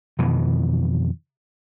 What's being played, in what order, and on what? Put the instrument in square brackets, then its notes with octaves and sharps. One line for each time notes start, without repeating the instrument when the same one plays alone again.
[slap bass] F2 B2 D#3 E3